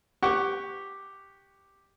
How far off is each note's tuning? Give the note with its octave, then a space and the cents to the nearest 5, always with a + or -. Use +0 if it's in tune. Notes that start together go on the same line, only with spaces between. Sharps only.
G4 +0 F#5 +15 C#6 +0